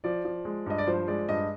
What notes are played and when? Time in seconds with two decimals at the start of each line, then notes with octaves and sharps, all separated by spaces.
0.04 F3 D5
0.25 F3
0.45 G#3
0.66 G2 D#5
0.78 D5
0.87 F3 C5
1.07 G#3 D5
1.29 G2 D#5